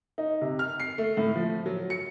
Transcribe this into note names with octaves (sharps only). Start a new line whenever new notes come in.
D#4
C3
F6
C7
A3
A2
F3
F#3
C#7